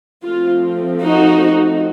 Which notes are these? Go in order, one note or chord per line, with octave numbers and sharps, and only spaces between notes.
F3 A3 C4 F4
D#4 F#4